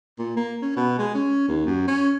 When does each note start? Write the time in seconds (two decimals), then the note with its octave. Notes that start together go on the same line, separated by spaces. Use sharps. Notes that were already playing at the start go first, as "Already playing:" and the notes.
0.19 A#2
0.36 A#3
0.62 C#4
0.76 B2
0.98 G#3
1.15 C#4
1.48 D#2
1.66 F#2
1.88 C#4